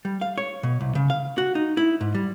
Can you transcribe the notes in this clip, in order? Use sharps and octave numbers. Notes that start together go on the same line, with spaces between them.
G3
F5
C#5
B2
C2
C#3
F5
F#4
D#4
E4
G#2
G3